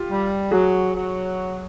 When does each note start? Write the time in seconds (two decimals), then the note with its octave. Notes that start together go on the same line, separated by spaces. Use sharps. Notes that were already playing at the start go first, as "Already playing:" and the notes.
Already playing: F4 G4
0.10 G3
0.51 F#3 F#4 G#4
0.93 F#3